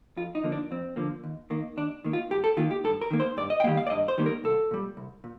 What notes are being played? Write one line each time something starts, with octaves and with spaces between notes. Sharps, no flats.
F2 F4
D#4
D3 F3 A#3
D4
F2 C4
D3 F3 A#3
D#2
D#3 A#3
D#2 D4
D#3 A#3
F4
G2 G4
A4
D#3 A#3 F4
G4
G2 A4
A#4
D#3 A#3
C5
G2 D5
D#5
G5
D#3 G3 A#3 F5
F5
D5
G2 D#5
C5
D#3 G3 A#3
A#4
C2 A4
A#2 G3
C2
A#2